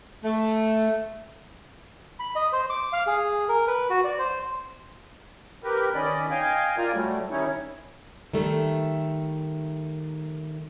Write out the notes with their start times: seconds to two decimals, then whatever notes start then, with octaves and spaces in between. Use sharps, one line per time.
0.24 A3
2.20 B5
2.36 D#5
2.53 C5
2.70 D6
2.93 F5
3.07 G#4
3.49 A#4
3.67 B4
3.90 F#4
4.04 D5
4.19 C5
5.64 G4 A#4 B4
5.95 D#3 C#4 D5 D#5 B5
6.31 D#5 F5 G5 G#5
6.78 F4 A#4 D5 G#5 A#5
6.94 F#3 G3 A3
7.31 D#3 G3 C#4 D#4 E4 C#5
8.33 D#3 G3 A3